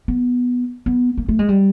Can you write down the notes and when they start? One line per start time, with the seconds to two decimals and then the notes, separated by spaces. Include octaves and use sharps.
0.08 B3
0.86 B3
1.17 A#3
1.29 A3
1.39 G#3
1.49 G3